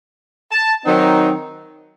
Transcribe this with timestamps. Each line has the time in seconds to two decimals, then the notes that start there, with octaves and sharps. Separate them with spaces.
0.51 A5
0.84 D#3 F#3 C4 D#4